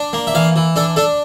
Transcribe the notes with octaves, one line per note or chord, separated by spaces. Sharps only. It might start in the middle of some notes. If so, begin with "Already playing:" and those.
Already playing: D4
A#3
E5
E3 F5
E3
D4 A4
D4 A4